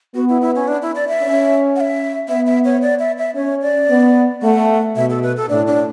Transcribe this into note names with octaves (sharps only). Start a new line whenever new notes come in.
B3 F#4
E4
E4
C#4
D4
E4
D5
E5
C#4
F#5
E5
B3 E5
E5
C#5
D5
E5
E5
C#4 C#5
D5
B3
A3 F#5
B2 E5
A4
B4
A4
A2 D4
D4